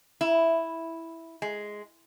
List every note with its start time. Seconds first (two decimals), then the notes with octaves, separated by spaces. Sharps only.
0.21 E4
1.42 G#3